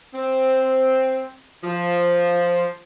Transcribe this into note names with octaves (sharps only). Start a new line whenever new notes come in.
C4
F3